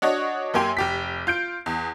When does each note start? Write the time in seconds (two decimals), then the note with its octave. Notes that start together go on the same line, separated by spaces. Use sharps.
0.02 D4 F#4 C#5 D#5
0.54 F#2 A#3 G4 G#5 C6
0.77 F1 G4 B6
1.27 F4 G6 D7
1.66 E2